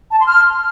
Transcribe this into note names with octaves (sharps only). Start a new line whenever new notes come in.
A5
C6
F6